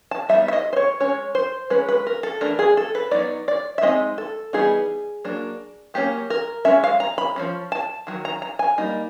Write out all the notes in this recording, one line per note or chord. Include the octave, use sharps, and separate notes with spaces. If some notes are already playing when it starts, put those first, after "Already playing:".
A5
G3 B3 D#4 E5
E5
D#5
C5
C#5
G#3 C#4 C#5
C5
G#3 C#4 B4
B4
A#4
A4
E3 A3 D4 A#4
G#4
A4
B4
F#3 B3 D#4 D5
D5
E5
G#3 C4 D#4 D#5
A4
E3 G3 B3 D#4 G#4
F#3 A#3 D4
F#3 A#3 C#4 G4
A#4
G#3 C#4 E5
F5
A#5
B5
F3 A3 C#4
A5
D#3 F#3
A#5
A#5
G#5
G3 A#3 D#4